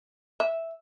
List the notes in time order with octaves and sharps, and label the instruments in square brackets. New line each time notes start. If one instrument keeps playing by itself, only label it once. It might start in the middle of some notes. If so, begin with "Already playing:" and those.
[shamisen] E5